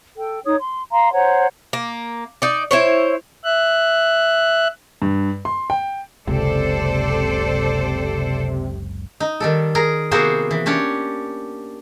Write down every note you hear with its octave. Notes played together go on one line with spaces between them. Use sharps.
A4 G5
D#4 C#5 D#6
C6
F5 A#5 C6
C5 C#5 F#5 A#5
A#3
D#4 D5
E4 C5 C#5
E5 F#6
G2
C6
G5
F#1 C#2 C3 A4 C5 D5
D#4
D#3 G3 A4
G#4 A#4 A#5
C3 A#3 B3 F#4 G#4 C5
E3
C#4 D4 G4 C#5